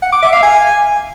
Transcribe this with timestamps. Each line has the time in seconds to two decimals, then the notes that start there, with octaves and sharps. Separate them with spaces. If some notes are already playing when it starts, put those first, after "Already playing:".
0.03 F#5
0.13 D6
0.23 E5
0.33 F5
0.43 G#5